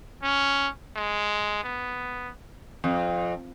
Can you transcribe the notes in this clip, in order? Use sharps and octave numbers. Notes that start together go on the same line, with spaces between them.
C#4
G#3
B3
F2